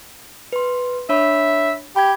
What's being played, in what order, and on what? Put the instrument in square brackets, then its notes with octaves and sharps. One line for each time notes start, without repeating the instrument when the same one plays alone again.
[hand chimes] B4 C6
[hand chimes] D4 C#5 B5 [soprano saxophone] E5
[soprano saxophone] G4 [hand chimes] B5 G#6